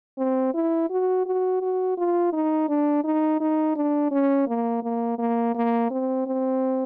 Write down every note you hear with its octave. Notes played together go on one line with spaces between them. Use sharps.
C4
E4
F#4
F#4
F#4
F4
D#4
D4
D#4
D#4
D4
C#4
A#3
A#3
A#3
A#3
C4
C4